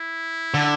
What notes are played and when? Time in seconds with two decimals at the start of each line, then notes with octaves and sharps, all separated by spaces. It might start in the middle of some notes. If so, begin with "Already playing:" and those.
Already playing: E4
0.54 D3